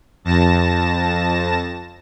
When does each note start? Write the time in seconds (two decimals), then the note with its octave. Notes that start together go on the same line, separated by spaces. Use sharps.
0.25 F2 A5 A#6 E7